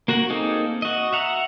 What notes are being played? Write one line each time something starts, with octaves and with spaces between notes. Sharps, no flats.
A#3 F#4 A#4 F#5
A#3 C4 D#4 G#4 A4
F#4 D#5
E5 F#5 A#5